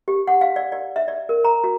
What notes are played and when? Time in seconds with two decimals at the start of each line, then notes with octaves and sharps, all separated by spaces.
0.08 G4
0.27 F#5
0.41 F5
0.56 D5
0.72 D5
0.96 E5
1.08 D5
1.29 A#4
1.44 A#5
1.64 F#4